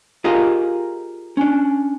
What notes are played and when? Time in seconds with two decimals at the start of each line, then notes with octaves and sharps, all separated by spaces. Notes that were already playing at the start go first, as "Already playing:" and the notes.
0.24 F4 G4 G#4 A#4 D#5 F5
1.37 C#4 D4